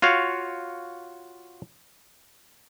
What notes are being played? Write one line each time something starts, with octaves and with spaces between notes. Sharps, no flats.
F4 F#4 C#5 F5